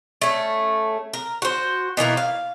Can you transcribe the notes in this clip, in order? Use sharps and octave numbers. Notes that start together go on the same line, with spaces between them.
A3 C#4
A#4
F#4 C5
B2 E3 A#3 A#4
F5